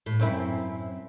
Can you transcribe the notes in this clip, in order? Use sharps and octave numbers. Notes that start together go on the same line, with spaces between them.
A2
F#2 C4 E4